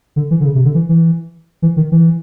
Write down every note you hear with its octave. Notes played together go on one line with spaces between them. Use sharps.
D3
E3
D3
C#3
C3
D3
E3
E3
E3
D#3
E3